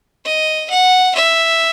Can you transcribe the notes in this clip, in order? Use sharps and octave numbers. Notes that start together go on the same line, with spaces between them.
D#5
F#5
E5